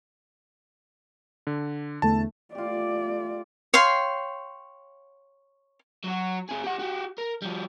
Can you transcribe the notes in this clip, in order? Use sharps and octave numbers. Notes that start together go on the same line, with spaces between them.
D3
E2 D3 A3 A5
A3 F4 G4 D5
C#5 F5 G5 C6
F#3 F#4
C4 G#4
G4 F#5
F#4 G4
A#4
F3 G3